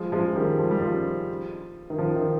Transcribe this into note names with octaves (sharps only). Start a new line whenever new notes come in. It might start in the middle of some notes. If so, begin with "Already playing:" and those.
Already playing: F3 G#3
F3 G#3
D#3 G3
F3
G3
F3
D#3
F3
D#3